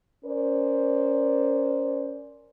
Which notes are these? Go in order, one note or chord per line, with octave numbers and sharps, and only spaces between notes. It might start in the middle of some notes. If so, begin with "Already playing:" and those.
C#4 A#4 C5 D5